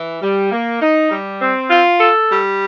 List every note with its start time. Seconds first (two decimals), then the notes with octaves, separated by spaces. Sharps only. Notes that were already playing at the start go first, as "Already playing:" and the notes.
Already playing: E3
0.22 G3
0.52 A#3
0.81 D#4
1.11 G3
1.41 C4
1.70 F4
2.00 A4
2.30 G3